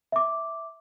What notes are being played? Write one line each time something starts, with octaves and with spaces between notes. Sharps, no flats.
E5 D6